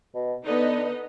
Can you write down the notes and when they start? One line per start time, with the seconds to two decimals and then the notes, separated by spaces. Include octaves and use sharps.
0.15 B2
0.47 D3 B3 D#4 D#5